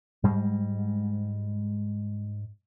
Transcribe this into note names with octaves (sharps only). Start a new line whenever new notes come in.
G#2 G3 G#3